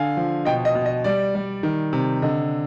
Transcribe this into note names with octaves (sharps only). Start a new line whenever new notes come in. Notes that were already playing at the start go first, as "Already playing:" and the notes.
Already playing: D3 F5 G#5
F3
B2 D#5 G5
D#5
B2
D#5
G3 D5
G3
D#3
C3
D3 D#5